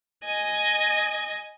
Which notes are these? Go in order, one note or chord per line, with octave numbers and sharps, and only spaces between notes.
D#5 G#5